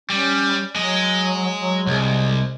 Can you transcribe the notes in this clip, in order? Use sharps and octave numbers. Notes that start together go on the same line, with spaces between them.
G3 C#4
F#3 G#3 D#5
F#3
C2 G#3